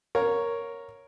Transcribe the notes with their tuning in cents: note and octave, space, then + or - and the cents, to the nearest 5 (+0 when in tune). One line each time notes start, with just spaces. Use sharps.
A#4 +0 C#5 +0 F5 +35